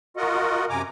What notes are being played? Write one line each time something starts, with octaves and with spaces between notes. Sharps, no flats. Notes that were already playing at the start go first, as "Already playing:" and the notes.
F4 F#4 A#4 D#5 F#5
F#2 C3 G#5 A#5 D6